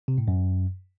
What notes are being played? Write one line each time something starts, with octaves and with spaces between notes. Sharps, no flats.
C3
A2
F#2